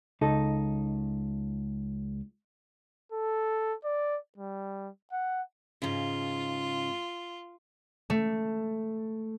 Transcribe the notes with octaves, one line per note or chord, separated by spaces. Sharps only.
C#2 D#4 A4
A4
D5
G3
F#5
G#2 C#3 F4
A3